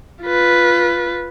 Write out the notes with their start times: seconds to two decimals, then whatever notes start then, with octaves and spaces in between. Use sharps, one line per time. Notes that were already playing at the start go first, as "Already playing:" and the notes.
0.24 F4 B4